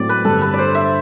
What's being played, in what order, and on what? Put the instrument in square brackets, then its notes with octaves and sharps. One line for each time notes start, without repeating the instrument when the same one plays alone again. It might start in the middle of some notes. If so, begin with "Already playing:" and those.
Already playing: [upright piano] A2 F#3 C4 [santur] D5
[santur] B4
[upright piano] G2 D3 A3 C4 [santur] A4
[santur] B4
D5
C5
E5